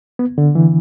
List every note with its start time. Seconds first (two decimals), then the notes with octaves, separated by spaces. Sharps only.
0.19 B3
0.38 D3
0.55 E3